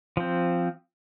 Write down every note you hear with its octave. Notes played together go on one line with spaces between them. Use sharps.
F3 C4